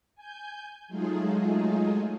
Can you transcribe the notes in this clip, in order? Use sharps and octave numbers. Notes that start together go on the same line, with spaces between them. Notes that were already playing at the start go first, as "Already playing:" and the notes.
G#5 G6
F#3 G#3 A3 D#4 F4 G#4